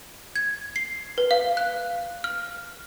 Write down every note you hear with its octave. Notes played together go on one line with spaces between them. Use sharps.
G#6
C7
B4
F5
F#6
F6